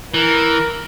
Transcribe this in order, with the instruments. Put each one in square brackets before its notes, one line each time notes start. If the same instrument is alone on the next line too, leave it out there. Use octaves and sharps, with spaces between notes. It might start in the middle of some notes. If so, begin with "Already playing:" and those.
[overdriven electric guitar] E3 [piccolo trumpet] A#4